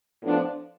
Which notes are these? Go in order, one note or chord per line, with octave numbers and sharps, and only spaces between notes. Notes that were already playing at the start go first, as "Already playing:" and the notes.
A2 F3 B3 D4 F4